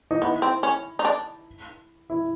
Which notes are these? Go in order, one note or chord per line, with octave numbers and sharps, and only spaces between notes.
D#4
B3 E4
C4
C#4
D#4
D4
E4